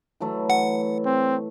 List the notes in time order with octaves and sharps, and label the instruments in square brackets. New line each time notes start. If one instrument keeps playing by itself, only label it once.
[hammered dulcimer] E3 F#3 A3
[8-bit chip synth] F#5
[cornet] C4